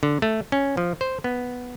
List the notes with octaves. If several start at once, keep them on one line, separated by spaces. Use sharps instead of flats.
D3
A3
C#4
F3
C5
B3